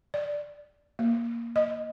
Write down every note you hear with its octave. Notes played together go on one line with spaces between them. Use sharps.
D5
A#3
D#5